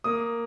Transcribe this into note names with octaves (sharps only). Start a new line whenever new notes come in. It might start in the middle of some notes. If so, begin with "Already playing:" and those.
A#3 D#6